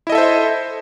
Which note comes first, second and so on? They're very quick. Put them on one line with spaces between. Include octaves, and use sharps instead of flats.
E4 D#5 A4 E5 C5